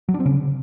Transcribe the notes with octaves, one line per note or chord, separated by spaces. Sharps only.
F#3
D4
C4
C#3